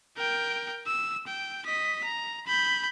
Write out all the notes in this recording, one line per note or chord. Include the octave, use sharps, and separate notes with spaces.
A#4 G5
E6
G5
D#5 B6
A#5
B5 G6